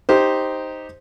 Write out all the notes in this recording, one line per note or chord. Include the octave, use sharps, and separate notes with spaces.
D#4 G4 C5